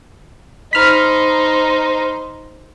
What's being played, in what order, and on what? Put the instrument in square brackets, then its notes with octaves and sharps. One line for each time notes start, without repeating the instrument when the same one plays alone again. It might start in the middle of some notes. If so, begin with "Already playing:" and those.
[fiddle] D#4 C5 [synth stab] B5 F6